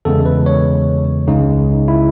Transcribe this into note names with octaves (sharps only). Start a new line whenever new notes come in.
E2 C#3 G#3 A4
B4
C#5
C#2 C#3 G#3 D#4
E4